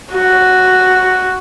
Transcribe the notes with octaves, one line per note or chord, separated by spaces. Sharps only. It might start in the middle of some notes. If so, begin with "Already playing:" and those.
F#4